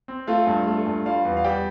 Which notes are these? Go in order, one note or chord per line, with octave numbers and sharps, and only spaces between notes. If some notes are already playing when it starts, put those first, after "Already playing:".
C4
A3 F4 F5
G2
A3
G2
G3 F4 F5
E2
F5
G3 G4 G5